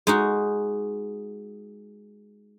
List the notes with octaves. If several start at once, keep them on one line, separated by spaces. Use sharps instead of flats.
G#3 D#4 F#4